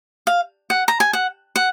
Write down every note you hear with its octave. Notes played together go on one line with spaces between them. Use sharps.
F5
F#5
A#5
G#5
F#5
F#5